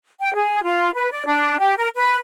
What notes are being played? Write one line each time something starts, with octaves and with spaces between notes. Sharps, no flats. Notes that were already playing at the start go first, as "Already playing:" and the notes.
G5
G#4
F4
B4
D5
D4
G4
A#4
B4